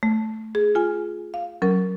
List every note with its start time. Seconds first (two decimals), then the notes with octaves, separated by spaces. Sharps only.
0.03 A3
0.55 G#4
0.75 F4 G#5
1.34 F5
1.62 F#3 C#4 A#4